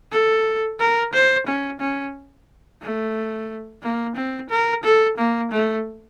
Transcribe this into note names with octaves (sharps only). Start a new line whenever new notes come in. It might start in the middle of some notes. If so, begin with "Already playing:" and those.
A4
A#4
C5
C#4
C#4
A3
A#3
C4
A#4
A4
A#3
A3